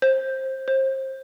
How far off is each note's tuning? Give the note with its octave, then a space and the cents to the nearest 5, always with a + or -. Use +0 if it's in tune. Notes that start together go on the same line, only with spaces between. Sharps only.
C5 +20
C5 +30